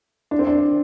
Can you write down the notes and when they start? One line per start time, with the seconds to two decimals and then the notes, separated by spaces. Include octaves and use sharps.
0.31 D4
0.39 C4
0.47 D4